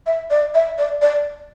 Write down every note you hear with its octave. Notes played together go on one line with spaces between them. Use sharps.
E5
D5
E5
D5
D5